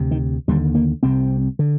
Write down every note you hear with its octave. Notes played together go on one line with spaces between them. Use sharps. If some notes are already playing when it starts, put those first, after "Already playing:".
Already playing: D2 C3
D#3
D#2 D3 G3
A#3
C2 C3 C4
D3